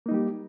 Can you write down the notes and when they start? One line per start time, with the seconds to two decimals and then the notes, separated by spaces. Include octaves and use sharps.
0.06 A#3
0.09 D#4
0.11 G3
0.14 G4